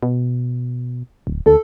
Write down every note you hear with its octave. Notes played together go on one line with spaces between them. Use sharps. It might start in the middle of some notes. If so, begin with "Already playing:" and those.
B2
D1
D2 A4